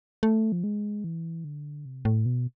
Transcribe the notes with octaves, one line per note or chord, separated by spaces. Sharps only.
A3
F3
G#3
E3
D3
C3
A2
B2